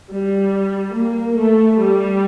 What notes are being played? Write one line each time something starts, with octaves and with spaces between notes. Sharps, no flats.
G3
A#3
A3
G3